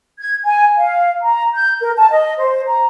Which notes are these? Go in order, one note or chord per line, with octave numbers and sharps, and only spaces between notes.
G#6
G#5
F5
A#5
G6
A#4
A5
D#5
C5
A#5